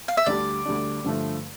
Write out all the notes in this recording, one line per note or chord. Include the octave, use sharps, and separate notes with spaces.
F5
E5
D2 D3 G3 D4 D5
D2 D3 G3 D4
G2 D3 F3 A3